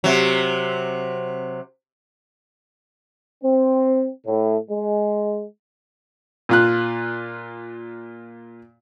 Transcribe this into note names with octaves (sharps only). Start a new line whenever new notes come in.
C3 F#3
C4
A2
G#3
A#2 F4 F#6